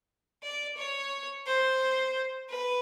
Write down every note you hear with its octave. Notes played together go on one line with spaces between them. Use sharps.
D5
C#5
C5
B4